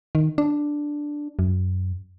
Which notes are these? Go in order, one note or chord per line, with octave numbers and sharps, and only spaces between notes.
D#3
D4
F#2